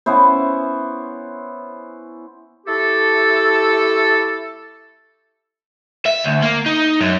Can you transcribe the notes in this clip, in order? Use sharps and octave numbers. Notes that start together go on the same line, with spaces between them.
B3 C#4 E4 C5
A3 E4 G4 A4
E5
D2
A#3
D#4
F#2